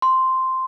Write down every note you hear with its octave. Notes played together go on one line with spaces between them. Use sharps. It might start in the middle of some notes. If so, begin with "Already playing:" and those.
C6